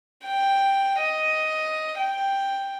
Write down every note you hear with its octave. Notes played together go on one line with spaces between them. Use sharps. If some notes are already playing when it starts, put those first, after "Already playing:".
G5
D#5
G5